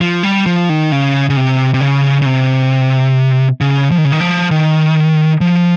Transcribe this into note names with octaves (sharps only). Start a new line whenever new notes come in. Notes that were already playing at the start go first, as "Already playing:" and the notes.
F3
G3
F3
D#3
C#3
C#3
C3
C3
C#3
C#3
C3
C#3
F3
D#3
C#3
D#3
F3
D#3
F3